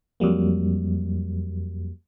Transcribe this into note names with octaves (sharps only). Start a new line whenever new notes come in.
F2 F#3 G3 A#3